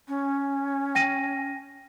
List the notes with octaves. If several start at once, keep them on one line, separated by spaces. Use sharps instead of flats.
C#4
G5 A#6 D#7